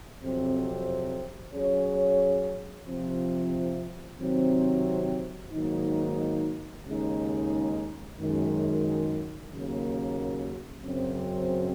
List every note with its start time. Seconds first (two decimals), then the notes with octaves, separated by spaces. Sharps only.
0.20 F2 C3 F#3 C4
1.53 F#3 C#4 G#4 C#5
2.87 C3 F3 C4
4.19 C3 D#3 F#3 C4
5.52 G#2 D#3 F#3 A#3 D#4
6.86 D#2 C#3 G#3 D#4
8.19 F#2 D#3 G#3
9.52 D#2 C#3 F#3 A#3
10.84 F#2 C#3 F#3 C4